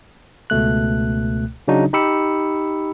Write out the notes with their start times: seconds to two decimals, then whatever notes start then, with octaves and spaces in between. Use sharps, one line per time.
0.50 C#2 B2 A3 F#6
1.68 C#3 F#3 D4 D#4 F#4
1.93 D#4 G4 B5 E6 C#7